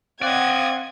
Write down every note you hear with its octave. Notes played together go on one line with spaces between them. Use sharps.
C4 D5 D#5 F5 F#5 G#6